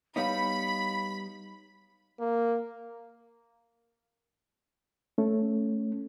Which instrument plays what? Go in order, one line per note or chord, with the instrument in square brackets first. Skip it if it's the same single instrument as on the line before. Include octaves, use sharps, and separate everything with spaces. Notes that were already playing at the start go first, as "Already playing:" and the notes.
[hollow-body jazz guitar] G3 B3 D#4 [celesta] C#5 F5 [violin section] B5 [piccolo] B6
[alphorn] A#3
[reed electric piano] A3 C#4